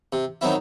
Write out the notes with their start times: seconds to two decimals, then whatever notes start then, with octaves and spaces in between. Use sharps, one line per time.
0.13 C3
0.41 D#3 F#3 C4 E4